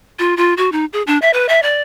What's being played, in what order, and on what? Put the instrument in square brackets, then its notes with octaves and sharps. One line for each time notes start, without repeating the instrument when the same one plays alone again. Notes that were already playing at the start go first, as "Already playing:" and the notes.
[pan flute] F4
F4
F#4
D#4
G#4
D4
E5
B4
E5
D5